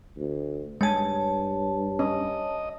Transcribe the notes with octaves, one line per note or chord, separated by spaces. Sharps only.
D2
G2 G#3 C#5 G#5 A5
C#4 D#5